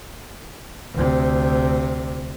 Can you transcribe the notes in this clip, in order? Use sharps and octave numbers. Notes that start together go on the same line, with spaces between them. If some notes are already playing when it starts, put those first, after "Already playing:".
D2 C3